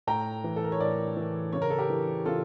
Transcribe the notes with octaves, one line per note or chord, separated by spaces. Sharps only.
A2 G5 A#5
E3
A4
A#4
C#5
A2 A#4 D5
E3
C#3 C#5
A#4
A4
G4 A#4
E3
C#3 F4 A4